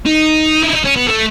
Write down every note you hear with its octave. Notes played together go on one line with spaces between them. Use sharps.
D#4
E4
D#4
C#4
B3
A3